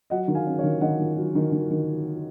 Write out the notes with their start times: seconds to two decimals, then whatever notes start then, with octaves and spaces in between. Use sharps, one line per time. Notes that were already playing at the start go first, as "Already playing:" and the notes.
0.10 F#3 D#5 F#5
0.28 D#3
0.35 F5 G#5
0.47 C#4
0.59 C#5 F5
0.63 D#3
0.81 D#3 D#5 F#5
0.99 D#3
1.16 F#3
1.35 D#3
1.52 D#3
1.71 D#3